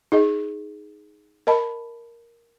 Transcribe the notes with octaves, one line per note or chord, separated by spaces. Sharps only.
D#4 G#4 D#5
A#4 D#5 A5 B5